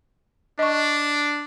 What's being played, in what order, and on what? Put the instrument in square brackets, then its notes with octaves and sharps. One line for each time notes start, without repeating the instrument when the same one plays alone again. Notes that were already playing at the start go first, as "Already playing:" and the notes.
[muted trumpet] D4 [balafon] D#5 C#6